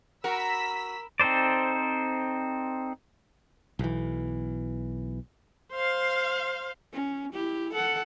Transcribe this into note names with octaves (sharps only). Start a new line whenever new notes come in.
F#4 A#4 B5 E6 B6
C4 D#4 A4 C5 D5
B1 E3
C5 F5
C#4
E4 G4
A4 F#5